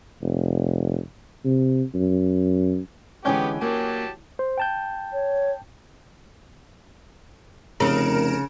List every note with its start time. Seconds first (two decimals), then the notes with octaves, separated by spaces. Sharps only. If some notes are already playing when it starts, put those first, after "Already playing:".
0.22 F1
1.45 C3
1.95 F#2
3.25 D3 E3 G#3 B3 C#4 G4 G5 G#5
3.61 F#3 A#3 G4 A5
4.39 C5
4.58 G5 A5 G6
5.13 C#5
7.80 F1 C#3 A#4 D7 E7